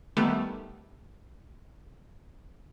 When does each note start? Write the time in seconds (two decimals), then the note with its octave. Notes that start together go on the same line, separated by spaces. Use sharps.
0.17 D#3 G3 A3 B3